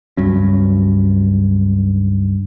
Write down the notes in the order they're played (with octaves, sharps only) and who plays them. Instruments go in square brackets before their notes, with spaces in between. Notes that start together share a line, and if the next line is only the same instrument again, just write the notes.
[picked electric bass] C#2 G2 F#3 C#4